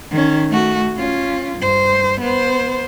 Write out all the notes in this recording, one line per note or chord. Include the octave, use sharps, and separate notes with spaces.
D#3 C#4
A3 F#4
C#4 F4
G2 C5
B3 C5